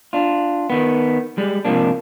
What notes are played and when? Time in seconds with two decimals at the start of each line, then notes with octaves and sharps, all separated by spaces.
0.13 D4 F4
0.70 D#3 B3
1.38 G3 G#3
1.65 G#2 C3 E3 F3 A#3 D4